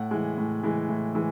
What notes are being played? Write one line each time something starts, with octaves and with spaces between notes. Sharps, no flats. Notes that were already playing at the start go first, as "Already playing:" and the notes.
Already playing: A2 F#5
E3 G#3
A2
E3 G#3
A2
E3 G#3